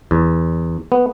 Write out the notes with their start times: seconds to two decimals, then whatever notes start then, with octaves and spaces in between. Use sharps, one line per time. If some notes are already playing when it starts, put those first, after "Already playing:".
0.11 E2
0.92 B3